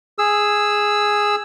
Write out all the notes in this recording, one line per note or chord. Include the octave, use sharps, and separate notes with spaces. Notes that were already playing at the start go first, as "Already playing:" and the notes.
G#4 E6